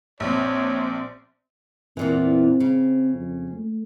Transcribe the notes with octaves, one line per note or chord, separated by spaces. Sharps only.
A#1 C4 C#5 D5
E2 A#2 E3 C4
C#3
F2
A3